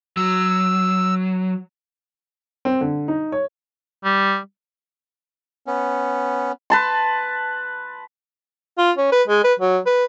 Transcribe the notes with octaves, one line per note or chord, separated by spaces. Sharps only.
F#3 E6
C4
D3
D#4
C#5
G3
B3 C#4
B4 A5 C6
F4
C#4
B4
G#3
B4
F#3
B4